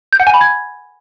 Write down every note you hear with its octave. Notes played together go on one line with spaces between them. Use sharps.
G6
F#5
G#5
B5
G#6